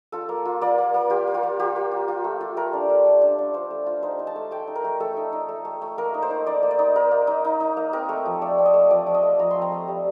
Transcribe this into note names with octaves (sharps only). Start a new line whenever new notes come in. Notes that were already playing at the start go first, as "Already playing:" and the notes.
F4 A4
A#3
F4
A#3 D5
A#3
A#3
F4 G4
A#3
F4
A#3
F4 G4
A#3
F4
F4
A3
F4
A3 A#4
D4
A3
A3
D4
D4
F4 C5
A3
F4
D#4 C5
D#4
A5
A3
A3 G5
D#4
A#4
A3
A3 A4
D#4
D#4
A3
A3
A3
A#3 A#4
D#4
C5
D#4
D#4 D5
A#3
D5
D#4
A#3 A#4
A#3
D#4
D#4
D#4
A#3
C4 A#4
A3
F3
A3 D5
C4
D#5
A3
F3 D5
F3
D#5
A3
F3 A#5
C4 C6
A#5
A3
G3